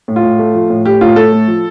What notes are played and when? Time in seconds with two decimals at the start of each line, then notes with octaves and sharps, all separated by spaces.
0.08 A2
0.16 F4
0.23 A2
0.39 A3
0.54 F3
0.70 A2
0.85 A2 G4
1.01 A2 F4
1.16 A2 A4
1.32 A3
1.48 F3